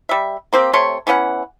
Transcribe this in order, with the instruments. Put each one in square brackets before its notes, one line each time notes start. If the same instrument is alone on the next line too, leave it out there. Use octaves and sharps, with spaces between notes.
[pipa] G3 E5
A#3 C4 G4
C3 A3 C#5 C6
E3 B3 C#4 F#5